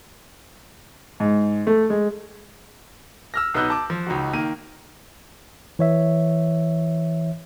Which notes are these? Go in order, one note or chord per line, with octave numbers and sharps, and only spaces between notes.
G#2
A3
G#3
E6 F6 A#6
B1 B3 D#4 E6 F#6 G6
A5 D6
F3
C#2 D#4 F#4
D#3 A#3 D#7
E3 C#5 E5